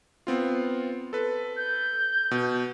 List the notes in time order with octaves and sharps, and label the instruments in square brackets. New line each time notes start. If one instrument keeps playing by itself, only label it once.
[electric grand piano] B3 C4 F4
A4 B4
[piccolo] G6
[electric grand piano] B2